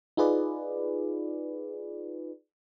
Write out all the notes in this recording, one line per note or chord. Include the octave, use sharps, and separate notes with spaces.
D#4 F4 G#4 B4 D5